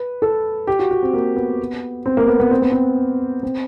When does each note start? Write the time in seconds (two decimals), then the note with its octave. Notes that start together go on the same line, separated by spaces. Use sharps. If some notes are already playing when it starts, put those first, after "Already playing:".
Already playing: B4
0.22 A4
0.67 G4
0.79 F#4
0.91 F#4
1.03 C4
1.14 A#3
1.37 B3
2.06 C4
2.17 A#3
2.28 B3
2.40 B3
2.51 C4
2.62 B3
2.72 C4
3.43 C4